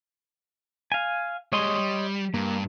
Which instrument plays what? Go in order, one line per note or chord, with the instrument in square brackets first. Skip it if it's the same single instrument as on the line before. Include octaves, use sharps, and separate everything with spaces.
[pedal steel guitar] F5 G#5
[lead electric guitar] G3 G#3 [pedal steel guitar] C#5 D#5 C6
[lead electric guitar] G3
[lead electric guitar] G2 [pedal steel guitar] A#3